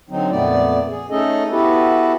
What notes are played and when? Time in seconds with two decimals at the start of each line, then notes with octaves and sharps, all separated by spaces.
0.10 D3 F#3 C4 D#4
0.31 F2 A#2 A3 B3 D5
0.89 G#4
1.10 A3 C#4 D#4 G#4 A4 D#5
1.51 B3 E4 F#4 G4 A4 B4